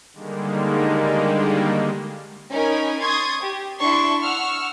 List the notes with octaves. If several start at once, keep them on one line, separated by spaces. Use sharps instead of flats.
D3 D#3 G3 G#3 A#3
C#4 D#4 A#4 G#5 B5
C6 C#6 D#6 G#6 A6
G4
D4 E4 C6 C#6
F#5 C#6 E6 F6